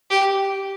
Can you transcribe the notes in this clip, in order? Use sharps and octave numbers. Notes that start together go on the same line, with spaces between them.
G4